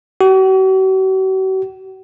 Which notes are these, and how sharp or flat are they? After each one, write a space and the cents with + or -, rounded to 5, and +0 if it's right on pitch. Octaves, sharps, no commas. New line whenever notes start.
F#4 +45